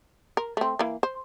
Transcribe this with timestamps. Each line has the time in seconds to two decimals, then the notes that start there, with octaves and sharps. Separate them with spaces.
0.37 A#4
0.57 A3 C4
0.79 E3 A#3
1.03 C5